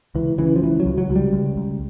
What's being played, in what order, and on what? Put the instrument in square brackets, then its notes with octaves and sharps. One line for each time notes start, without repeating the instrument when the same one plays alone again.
[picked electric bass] C#2 E3
C#3 E3
F3
C#2 E3
F#3
C#2
F#3
C#2
G3
C#2
C#2